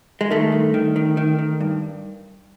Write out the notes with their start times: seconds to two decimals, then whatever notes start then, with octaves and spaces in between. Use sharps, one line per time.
0.21 G#3
0.30 D#3 A3
0.52 G2
0.74 D#3
0.96 D#3
1.17 D#3
1.39 D#3
1.61 G2